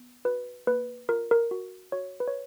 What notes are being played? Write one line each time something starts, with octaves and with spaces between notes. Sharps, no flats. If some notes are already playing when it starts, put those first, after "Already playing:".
Already playing: B3
F#4 B4
A#3 B4
F4 A#4
A#4
F#4
F#4 C#5
B4
C#5